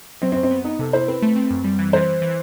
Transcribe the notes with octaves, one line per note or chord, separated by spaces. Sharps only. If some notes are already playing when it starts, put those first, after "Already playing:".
F#3 C4
C4
F#2
C4
B3
B3 D#4
C3 A4
E4 C5
C4 B4
A3
C4
F#2
G3
E3
E3 C5
E3
E3